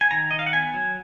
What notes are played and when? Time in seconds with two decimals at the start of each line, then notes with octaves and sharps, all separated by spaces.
0.01 G#5
0.11 D#3 A#5
0.31 D#3 D#5
0.39 F5
0.46 F#5
0.53 B3 G#5
0.74 F#3